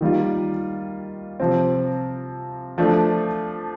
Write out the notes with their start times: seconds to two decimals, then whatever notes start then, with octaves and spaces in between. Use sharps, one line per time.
0.01 D#3 G3 A#3 F4
1.40 C3 F3 C4
2.78 F3 A3 D4